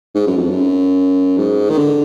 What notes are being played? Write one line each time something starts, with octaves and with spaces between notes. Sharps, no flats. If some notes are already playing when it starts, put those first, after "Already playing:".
G#2
F#2
F2
F#2
G#2
D#3
D3